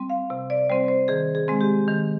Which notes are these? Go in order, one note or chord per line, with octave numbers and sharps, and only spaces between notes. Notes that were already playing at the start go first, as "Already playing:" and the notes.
Already playing: G3 C4
F5
C3
D5
G3 C4 C5
C5
D#3 G#4
G#4
G#3 C4
G4
D#3